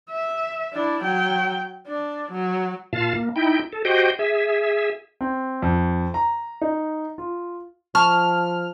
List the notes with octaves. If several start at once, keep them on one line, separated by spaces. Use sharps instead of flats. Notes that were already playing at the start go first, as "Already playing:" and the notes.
E5
D4 E4
F#3 G5
D4
F#3
A#2 F4 F5 A5
A#3
D#4 E4 G5
A4
F#4 G4 C5 D#5 G5
G#4 E5
C4
F2
A#5
D#4
F4
F3 A5 C#6 F6